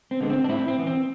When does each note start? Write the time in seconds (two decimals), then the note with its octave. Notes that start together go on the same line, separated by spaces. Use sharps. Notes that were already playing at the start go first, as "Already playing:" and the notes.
0.11 C4
0.21 D3 G#3 B3
0.30 C4
0.44 D4
0.48 A2 C4 E4
0.68 C4
0.78 E3 B3
0.87 C4